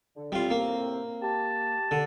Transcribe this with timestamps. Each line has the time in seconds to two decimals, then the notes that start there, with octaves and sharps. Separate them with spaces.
0.16 D3
0.32 A2 C3 G3 C4 F4
0.50 A#3
1.22 G4 A5
1.91 D3